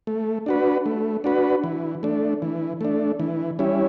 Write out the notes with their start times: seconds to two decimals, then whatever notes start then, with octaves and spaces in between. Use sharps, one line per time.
0.07 A3
0.46 D4 F#4 B4
0.86 A3
1.24 D4 F#4 B4
1.64 E3
2.03 A3 D4
2.42 E3
2.81 A3 D4
3.20 E3
3.59 G3 C#4 E4